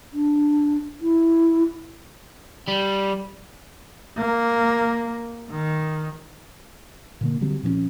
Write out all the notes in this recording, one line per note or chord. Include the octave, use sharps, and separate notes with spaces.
D4
E4
G3
A#3
D#3
A#2 D3 A#3
D3 F#3 G3 C4
A#2 F3 C4 C#4